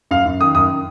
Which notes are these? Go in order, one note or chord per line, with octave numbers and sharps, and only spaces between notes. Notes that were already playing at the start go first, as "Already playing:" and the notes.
F#2 F5
F#2
D#3 D#6
F#2 D#6